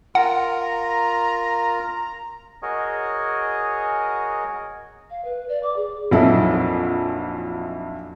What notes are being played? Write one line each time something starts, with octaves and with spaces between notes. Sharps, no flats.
F4 A#4 F#5 A#5
F#4 G#4 A#4 C#5 D#5
F5
B4
D5
D6
G#4
A#1 F2 F#3 D#4 E4 A4